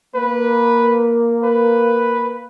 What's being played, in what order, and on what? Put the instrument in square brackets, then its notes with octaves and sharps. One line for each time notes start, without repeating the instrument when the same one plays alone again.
[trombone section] A#3 [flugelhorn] B4
[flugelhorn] B4